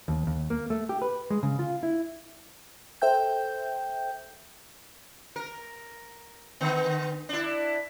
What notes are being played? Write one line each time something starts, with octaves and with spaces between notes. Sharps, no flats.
D#2
D#2
A#3
A3
G4
B4
G#3
C#3
F4
E4
A4 C5 E5 G5 G6
A#4
D3 B3
D4 E4